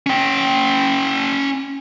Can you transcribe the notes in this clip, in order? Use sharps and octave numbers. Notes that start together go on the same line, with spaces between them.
C#4 G5